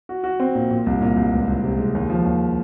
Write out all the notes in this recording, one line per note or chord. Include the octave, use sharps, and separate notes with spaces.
F#4
F#4
C4
A#2
A#2
C2
A#2
C2
C#2
C#2
C3
G#3
D#2
F3
D#2